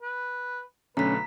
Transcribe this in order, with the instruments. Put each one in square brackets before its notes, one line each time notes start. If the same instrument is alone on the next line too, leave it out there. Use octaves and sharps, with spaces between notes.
[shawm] B4
[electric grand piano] B1 D3 A3 [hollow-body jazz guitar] C#4 [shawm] B4 [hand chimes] A#5 B6